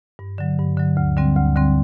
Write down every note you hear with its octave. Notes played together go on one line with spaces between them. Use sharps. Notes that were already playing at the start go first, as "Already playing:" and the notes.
G2
D3 F#3
G2
D3 F#3
D2
D3 G3 C4
D2
D3 G3 C4